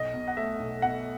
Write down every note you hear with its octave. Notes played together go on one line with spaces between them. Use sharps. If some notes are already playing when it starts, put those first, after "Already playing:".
Already playing: B1 D#5
B2
F#5
A3 E5
B1
B2 F#5